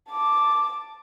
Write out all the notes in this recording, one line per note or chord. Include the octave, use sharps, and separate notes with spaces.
A5 D6